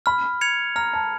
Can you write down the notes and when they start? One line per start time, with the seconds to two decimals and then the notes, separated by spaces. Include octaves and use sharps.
0.06 B5 F6
0.41 G#6 C#7 F7
0.76 A#5 F6
0.93 A5